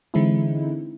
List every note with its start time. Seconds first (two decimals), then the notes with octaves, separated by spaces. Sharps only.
0.14 D3 E3 G#3 C4 D#4 E4